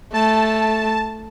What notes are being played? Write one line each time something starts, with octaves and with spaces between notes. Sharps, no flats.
A3 A5